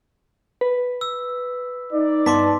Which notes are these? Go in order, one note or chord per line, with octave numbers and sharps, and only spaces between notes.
B4
E6
D#4 D5
G2 B3 A5 C6 D6 B6